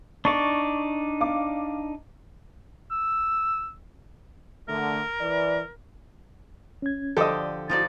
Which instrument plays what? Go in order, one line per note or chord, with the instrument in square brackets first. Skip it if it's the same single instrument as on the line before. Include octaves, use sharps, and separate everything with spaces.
[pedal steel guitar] D4 D#4 D5 [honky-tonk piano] C#6
[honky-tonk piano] F5 D6
[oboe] E6
[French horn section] D3 A3 [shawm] A#4
[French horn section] E3 D5
[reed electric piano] C#4 G#6
[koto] D3 F3 G4 [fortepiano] A4 D#5 [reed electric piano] D5
[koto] F3 D#4 D5 [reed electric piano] E4 F#4 [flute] A6